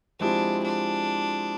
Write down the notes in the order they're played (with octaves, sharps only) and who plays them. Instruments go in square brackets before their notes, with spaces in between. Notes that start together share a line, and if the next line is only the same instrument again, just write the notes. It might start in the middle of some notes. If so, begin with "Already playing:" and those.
[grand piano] F3 G#3 C4 E4 G4 [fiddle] D4
[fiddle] D4